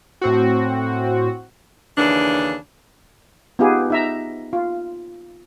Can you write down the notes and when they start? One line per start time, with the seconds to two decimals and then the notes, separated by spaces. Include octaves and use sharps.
0.21 A2 C4 F#4
1.98 D#2 C#3 E3 D4
3.59 B3 D#4 F4 G4 G#4
3.90 D#4 E5 A#5
4.53 F4